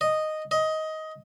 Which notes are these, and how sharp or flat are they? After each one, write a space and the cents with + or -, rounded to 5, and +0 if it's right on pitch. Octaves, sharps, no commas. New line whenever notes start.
D#5 -5
D#5 +15